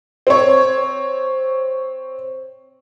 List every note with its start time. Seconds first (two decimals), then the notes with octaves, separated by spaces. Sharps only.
0.27 C4 C#5